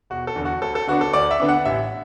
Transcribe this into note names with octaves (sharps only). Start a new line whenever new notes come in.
E1 F#4
A4
E2 D3
F#4
D2 A4
A4
D3 B3 D4 F#4
A4
D2 D5
E5
D3 B3 D4
F#5
A1 E5